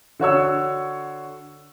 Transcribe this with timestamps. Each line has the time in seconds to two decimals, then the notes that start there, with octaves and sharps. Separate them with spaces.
0.19 D3 F#4 C#5 E6